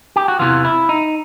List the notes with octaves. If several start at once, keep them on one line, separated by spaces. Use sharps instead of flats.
G4
F#4
E2 C3 E3 F4
E4
D#4